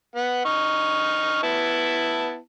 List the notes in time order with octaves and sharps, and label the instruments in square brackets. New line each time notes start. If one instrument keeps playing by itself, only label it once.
[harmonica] B3 F#5
D#4 C#6 F6
B3 E4 A5